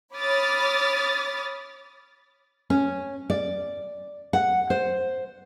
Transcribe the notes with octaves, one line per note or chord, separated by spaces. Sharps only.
C#5 B5 D6 D#6 F6 A6
C#4
D5
F#5
C5